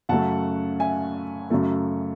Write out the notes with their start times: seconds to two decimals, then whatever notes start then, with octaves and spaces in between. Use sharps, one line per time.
0.09 F#2 C#3 F#3 A3 F#5 A5
0.80 E5 G#5
1.50 F#2 C#3 F#3 A3